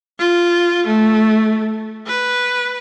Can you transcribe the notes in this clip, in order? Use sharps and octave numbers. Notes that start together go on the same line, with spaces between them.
F4
A3
B4